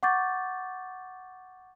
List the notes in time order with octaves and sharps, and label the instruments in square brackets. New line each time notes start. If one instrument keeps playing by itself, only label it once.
[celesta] F#5 C#6 D6 G6 A6